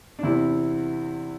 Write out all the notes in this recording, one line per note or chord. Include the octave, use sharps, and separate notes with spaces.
D4
E2 C3 E3 E4